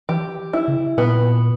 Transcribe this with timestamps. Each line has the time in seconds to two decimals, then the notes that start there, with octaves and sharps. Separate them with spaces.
0.09 E3 G4
0.53 E4
0.68 C#3
0.98 A#2 B3